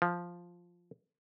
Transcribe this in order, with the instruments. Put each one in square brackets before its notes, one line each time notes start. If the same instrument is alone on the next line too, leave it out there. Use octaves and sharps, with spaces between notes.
[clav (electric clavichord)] F3